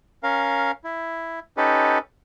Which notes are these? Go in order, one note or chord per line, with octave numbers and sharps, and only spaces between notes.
C#4 A#4 F5
E4
C#4 D#4 G4 A4 B4